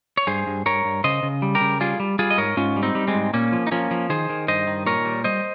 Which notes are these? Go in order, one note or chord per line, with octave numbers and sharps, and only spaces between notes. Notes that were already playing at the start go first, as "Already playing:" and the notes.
C#5
G2 G#4 C5
G2
G2 A#4 C#5
G2
C#3 C5 D#5
C#3
G3
G4 A#4
C#3
G3 F4 G#4
G3
G3 F4 G#4
D#5
G#2 A#4 C#5
G#2 C#4 F4
G3
C4 D#4
G3
G#3 C4
G#2
A#2 A#3 C#4
F3
D#4
F3 A#3 C#4
F3
D#3 G#4 C5
D#3
G2 C5 D#5
D#3
A#2 A#4 C#5
G3
G3 C5 D#5